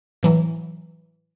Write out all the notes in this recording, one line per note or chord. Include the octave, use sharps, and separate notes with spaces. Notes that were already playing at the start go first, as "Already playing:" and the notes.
A2 E3 F#3